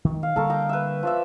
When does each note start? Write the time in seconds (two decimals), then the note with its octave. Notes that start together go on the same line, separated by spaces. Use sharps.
0.05 D#3
0.23 F5
0.36 D3 G3 A#3 A4 A#4 C#6
0.49 D#5 G5 A#5
0.69 B4 E5
1.03 F3 D5 E5